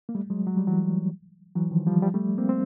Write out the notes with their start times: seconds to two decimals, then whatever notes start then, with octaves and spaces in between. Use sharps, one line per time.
0.09 A#3
0.15 G3 A3
0.30 F#3 G#3
0.46 F#3
0.57 G3
0.67 E3 F#3
1.55 E3 F#3
1.71 D#3 F3
1.87 F3 G3
2.02 F3 G3
2.14 G3 A3
2.38 A#3 C4
2.49 C4